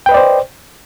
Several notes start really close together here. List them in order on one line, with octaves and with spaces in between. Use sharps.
G5 B4 D#5 D5 C5